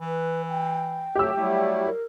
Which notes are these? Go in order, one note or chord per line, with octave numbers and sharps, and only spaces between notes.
E3 B4
G5
F#3 A3 G4 E6
F#3 G3 A3 E4
A#4